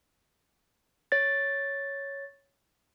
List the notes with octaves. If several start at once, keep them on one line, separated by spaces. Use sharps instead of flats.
C#5 A6